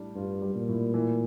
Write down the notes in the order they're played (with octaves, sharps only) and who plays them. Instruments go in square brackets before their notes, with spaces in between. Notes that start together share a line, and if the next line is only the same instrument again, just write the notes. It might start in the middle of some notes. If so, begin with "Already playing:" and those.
Already playing: [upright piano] A2 G3 D4
[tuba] G2 [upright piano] F4
[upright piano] G3
[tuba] A#2
[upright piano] A2
E3